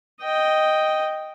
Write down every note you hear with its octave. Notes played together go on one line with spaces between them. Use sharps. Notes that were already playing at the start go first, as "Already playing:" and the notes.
D#5 G5